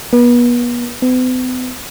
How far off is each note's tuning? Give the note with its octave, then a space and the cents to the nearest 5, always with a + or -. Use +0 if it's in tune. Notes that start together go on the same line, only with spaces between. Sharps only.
B3 -35
B3 +45